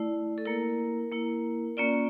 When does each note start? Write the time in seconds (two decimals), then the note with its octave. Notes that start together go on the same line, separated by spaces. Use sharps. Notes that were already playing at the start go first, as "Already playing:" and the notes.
Already playing: A3 E4 D5
0.38 A4
0.46 A#3 E4 A#4
1.12 A#3 E4
1.77 A#3 C#4 F4 D5